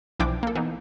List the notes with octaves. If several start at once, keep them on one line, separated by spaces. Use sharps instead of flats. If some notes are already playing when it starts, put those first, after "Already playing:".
B1 E3 F3 D4 G5 D6
A#3 A4
E3 B3 D#4